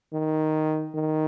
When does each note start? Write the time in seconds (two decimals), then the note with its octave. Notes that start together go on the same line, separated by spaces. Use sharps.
0.13 D#3
0.95 D#3